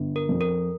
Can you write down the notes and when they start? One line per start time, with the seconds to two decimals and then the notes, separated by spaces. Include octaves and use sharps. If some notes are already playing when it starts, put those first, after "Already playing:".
Already playing: G1
0.16 A#4
0.29 F2 F3 C4
0.41 A#4